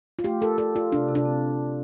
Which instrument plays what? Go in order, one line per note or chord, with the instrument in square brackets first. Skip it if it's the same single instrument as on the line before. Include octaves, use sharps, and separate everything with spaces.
[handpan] F4
[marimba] A3 [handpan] G4
[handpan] A4 [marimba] A#4
[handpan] A4 [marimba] D5
[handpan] F4 [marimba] D5
[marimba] C3 [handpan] D4
[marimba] C3
[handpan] D4
[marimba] C4